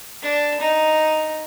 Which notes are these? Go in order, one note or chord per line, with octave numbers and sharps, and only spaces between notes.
D4
D#4